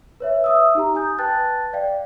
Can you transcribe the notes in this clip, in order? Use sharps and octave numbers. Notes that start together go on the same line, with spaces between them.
B4 C#5 E5
E5 D#6 E6
D#4 G4 A#5
G#5 D#6 G6
B4 G5 A5 F#6 A6
D5 F5 G5